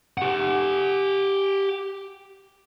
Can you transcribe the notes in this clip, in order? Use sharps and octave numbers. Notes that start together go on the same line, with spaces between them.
G4 F#5